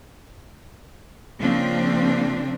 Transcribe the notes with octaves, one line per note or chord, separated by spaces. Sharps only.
C#3 F3 A#3 C4 D4